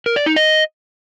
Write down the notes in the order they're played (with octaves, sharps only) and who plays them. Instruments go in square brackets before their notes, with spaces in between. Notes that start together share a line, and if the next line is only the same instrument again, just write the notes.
[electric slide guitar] A#4
D5
D#4
D#5